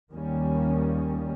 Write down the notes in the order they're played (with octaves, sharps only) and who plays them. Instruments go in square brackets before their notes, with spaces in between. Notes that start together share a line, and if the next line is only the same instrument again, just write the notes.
[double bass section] D#2 D#3 G3 A#3 C#4